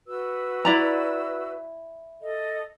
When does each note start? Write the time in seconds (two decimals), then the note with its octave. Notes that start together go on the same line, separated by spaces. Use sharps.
0.07 F#4 B4 E6
0.65 E4 D5 A#5
2.22 A4 D#5